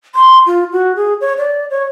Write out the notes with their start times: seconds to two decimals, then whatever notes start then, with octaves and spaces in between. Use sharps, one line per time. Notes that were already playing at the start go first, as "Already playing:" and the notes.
0.15 C6
0.47 F4
0.72 F#4
0.96 G#4
1.21 C#5
1.38 D5
1.71 C#5